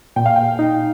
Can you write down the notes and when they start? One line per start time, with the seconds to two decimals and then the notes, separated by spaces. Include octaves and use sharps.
0.16 A#2 G5
0.26 F5
0.36 G5
0.59 D#4